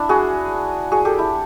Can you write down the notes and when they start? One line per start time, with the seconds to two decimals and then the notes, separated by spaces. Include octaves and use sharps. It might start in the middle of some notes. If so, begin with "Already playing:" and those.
Already playing: D4 E4
0.09 F#4 G#4
0.92 F#4 G#4
1.05 G4 A4
1.19 E4